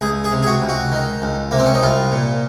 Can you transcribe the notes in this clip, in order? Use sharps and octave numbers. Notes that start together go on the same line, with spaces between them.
C#2 G#4
G#4
C3
G#4
F#4
C#2
F#4
D#3
C#2
C3 A#3
C4
C#4
D#4
C2 F4
A#2